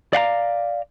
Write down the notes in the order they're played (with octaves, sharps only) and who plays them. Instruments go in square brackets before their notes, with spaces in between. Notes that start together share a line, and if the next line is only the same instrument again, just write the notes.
[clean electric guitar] D5 F5 F#5 A#5